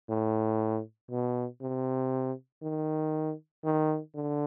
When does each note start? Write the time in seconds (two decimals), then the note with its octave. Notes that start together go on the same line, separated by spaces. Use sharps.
0.09 A2
1.11 B2
1.61 C3
2.63 D#3
3.64 D#3
4.15 D3